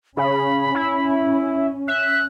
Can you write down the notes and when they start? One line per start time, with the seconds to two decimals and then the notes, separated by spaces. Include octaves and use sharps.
0.17 C#3 C#4 B5
0.75 E4
1.88 E5 F#6